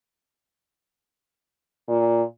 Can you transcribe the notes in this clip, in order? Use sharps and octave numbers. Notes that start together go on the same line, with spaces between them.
A#2